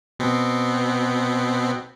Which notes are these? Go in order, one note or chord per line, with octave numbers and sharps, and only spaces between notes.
B2 B3 C4